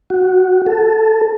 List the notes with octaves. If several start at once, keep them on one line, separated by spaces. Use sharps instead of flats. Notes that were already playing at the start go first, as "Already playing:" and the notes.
F#4
A4